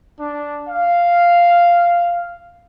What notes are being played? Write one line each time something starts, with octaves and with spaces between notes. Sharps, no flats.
D4
F5